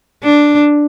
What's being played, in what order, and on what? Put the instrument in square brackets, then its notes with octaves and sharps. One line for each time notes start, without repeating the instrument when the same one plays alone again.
[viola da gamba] D4